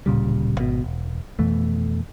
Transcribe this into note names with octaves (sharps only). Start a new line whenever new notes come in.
D1 A#2 C#3 G3
G#1 B2
E1
F2 B2 E3 A3